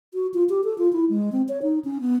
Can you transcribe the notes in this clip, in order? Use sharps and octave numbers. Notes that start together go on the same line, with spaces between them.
F#4
F4
G4
A4
F4
E4
G#3
C4
C#5
D#4
C#4
B3